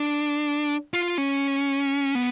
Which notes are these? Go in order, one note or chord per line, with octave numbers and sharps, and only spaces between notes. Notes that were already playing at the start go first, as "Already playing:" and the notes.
Already playing: D4
F4
C#4
B3